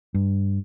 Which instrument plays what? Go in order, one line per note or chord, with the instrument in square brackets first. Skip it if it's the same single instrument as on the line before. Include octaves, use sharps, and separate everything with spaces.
[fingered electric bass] G2